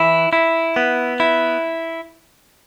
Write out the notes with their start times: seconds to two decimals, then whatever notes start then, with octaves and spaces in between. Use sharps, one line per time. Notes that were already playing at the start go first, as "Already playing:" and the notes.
Already playing: E3 E4
0.33 E4
0.76 B3
1.20 E4